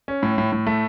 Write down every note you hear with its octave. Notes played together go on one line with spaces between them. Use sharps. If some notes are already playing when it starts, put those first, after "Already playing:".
C#4
A2
A2
A2
A3